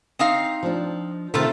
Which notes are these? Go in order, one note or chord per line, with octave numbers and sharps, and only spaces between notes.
C4 D#4 F5
F3 D4
C3 D#3 A3 F4 A4